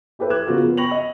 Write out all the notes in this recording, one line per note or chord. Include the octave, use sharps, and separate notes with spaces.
E4 G4 A4 B4 C5 E5
D6 F#6 G#6 E7
C#3 F3 B3 F4 F#4 A#4
B3
G5 B5 C#6 A#6 F7 F#7
D#5